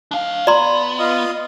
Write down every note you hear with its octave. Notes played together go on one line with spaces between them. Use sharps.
D4 F5
B3 D5 A#5 C6
F4 D#5